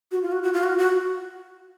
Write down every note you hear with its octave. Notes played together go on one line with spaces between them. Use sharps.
F#4
F4
F#4
F#4
F4
F#4
F#4